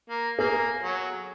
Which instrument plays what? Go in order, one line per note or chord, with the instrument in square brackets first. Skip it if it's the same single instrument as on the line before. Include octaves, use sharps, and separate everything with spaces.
[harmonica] A#3
[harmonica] A#3 [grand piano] G#4
[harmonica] F#3